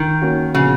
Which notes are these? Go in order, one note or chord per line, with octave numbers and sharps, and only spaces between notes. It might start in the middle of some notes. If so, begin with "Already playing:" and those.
Already playing: D#3
A#3 C#4 F#4
A#2 C#3 F3 B3 F#4